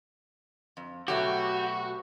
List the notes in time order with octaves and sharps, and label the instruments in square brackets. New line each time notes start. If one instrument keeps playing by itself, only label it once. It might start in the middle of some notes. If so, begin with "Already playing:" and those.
[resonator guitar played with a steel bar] F2
[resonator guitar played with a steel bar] B2 F#3 A3 [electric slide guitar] F#4 [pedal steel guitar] G4